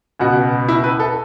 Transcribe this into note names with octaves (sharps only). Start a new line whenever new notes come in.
C#2 B2 F#4
E4
B4
A4